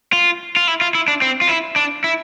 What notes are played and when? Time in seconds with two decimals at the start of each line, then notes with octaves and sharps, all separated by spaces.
0.13 F4
0.56 F4
0.68 E4
0.81 F4
0.95 E4
1.08 D4
1.22 C4
1.42 F4
1.49 E4
1.76 D4
2.04 E4